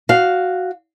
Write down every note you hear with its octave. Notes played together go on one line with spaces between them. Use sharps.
F#4 F5